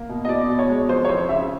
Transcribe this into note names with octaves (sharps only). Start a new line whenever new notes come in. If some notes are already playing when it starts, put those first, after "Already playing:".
Already playing: A#3
B2
D#5
B2 D5
B2
C#5
G#3
F2 C5
C#5
F2 C5
C#3 E5